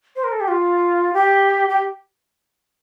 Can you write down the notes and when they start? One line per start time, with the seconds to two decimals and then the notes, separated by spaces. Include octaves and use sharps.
0.16 C5
0.24 A#4
0.32 A4
0.41 G4
0.48 F4
1.13 G4
1.69 G4